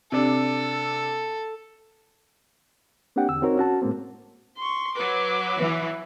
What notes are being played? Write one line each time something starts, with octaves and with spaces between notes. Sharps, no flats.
C3 D4 A4
A#3 C4 D4 G4 F#5 G5
E2 D3 E6
C4 D#4 F#4 A#4 C#5
C#4 F#4 A5
A2 G#3 A#3 C4
C6 C#6
F#3 B4 D6
E3